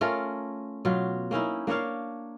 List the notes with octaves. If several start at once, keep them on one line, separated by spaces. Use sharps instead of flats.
A3 C#4 F4 A#4
B2 F#3 F4
A#3 C#4 D#4 E4
A#3 D4 C#5 F5